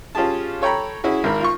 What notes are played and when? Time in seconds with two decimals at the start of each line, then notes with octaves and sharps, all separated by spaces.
0.15 C#4 F4 G4 G#4 A5
0.62 A4 C#5 G5 A#5 B5
1.04 C#4 E4 F#4 G#4
1.24 G#1 A#4 B5
1.40 F4 C#6